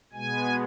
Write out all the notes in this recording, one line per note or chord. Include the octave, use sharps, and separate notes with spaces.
B2 G#3 B3 G#5